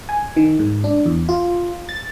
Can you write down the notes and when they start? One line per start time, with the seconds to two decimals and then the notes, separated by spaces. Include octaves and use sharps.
0.09 G#5
0.36 D#3
0.59 G#2
0.84 D4
1.06 E2
1.29 F4
1.89 A6